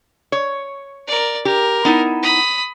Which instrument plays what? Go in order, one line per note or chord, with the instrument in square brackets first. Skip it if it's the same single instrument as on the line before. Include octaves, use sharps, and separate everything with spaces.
[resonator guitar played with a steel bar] C#5
[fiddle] A#4 D5
[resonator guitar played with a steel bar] G4 [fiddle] A#4
[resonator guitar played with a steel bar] B3 D#4 E4
[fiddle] B5 D#6